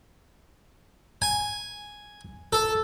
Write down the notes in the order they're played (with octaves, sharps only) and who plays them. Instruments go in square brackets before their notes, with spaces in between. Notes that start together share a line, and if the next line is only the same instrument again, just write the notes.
[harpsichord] G#5
A4